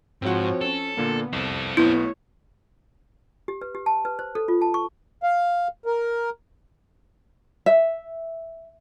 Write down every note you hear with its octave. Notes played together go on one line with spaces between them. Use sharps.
G#2 F3 C4 F#4 C#5 F#5
C#4 A4
A#2 D3 A#3 B3
C2 C4 A4
B1 A3 B3 E4 C#5 G6
G4
B4
G4
A5
B4
C5
A4
F4
A5
C#6
F5
A#4
E5